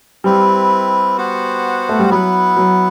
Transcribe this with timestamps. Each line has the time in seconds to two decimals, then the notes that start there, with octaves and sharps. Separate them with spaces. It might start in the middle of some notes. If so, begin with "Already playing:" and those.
0.24 G3 C4 E4 B4
1.17 B3 F#4 C5 F#5
1.89 A3
1.99 G3
2.10 F#3 B3 E4 B4 F#5
2.57 F#3